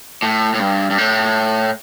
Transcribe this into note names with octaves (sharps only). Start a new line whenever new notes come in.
A2
A2
G2
G2
A2